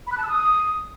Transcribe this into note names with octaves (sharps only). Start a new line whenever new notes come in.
B5
F#6
A5
E6
D#6